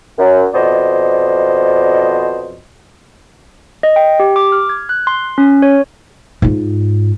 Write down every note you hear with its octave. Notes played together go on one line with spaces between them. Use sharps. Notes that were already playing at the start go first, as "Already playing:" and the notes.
F#2
F2 B2 C5 D5 D#5
D#5
G5
G4
D6
F6
G#6
F#6
C6
C#4
C#5
G#2 F4